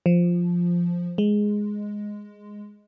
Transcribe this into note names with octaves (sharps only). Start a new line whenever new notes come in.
F3
G#3